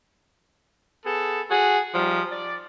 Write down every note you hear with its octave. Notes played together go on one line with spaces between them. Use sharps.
B3 G#4 A4
F#4 G#4
F3 G3 D#4
D5